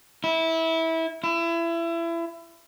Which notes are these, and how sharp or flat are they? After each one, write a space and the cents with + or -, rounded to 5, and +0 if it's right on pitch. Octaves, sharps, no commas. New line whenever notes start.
E4 -20
E4 +30